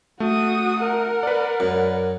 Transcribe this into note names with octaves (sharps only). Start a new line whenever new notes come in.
A3 F#4 D#6
A#4 F#5
B4 D5
F#2